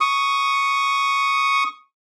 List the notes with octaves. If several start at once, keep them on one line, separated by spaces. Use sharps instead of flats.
C#6 D#6